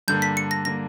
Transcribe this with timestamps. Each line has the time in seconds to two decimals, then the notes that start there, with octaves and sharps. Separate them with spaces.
0.08 G2 D3 A#3 G6
0.22 B6
0.37 C#7
0.51 A#6
0.65 D3 A#3 A#6